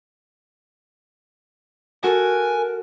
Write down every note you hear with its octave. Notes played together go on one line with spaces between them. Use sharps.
F#4 A4 A#4 G#5